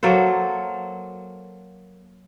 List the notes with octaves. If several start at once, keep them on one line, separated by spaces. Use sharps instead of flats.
F#3 A#3 A4 C5